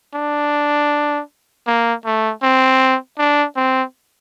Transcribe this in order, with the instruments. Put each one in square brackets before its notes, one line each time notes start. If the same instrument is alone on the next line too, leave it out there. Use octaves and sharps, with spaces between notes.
[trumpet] D4
A#3
A3
C4
D4
C4